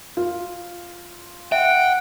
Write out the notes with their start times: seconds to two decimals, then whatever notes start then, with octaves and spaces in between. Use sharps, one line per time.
0.17 F4
1.52 E5 F#5 G5